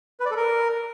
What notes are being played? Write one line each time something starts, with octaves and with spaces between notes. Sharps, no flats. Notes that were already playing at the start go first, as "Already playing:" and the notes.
B4
D5
A4
A#4